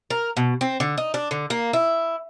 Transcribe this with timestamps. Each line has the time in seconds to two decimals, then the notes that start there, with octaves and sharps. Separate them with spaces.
0.10 A#4
0.37 B2
0.61 C4
0.80 D3
0.98 D#4
1.14 D4
1.31 D3
1.50 A#3
1.73 E4